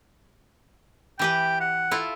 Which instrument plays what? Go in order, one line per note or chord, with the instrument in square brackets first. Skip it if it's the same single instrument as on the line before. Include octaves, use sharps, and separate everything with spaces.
[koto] E3 G4 B4 [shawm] G5
[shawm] F#5
[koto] E4 F4 A4